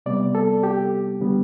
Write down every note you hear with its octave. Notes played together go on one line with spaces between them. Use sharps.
C3 G3 B3 D5
A4
G4
D3 G3 B3